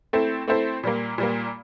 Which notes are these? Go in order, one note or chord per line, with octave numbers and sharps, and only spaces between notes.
A3 C4 E4 A4 C5
A3 C4 E4 A4 C5
A#2 G3 A#3
A#2 G3 A#3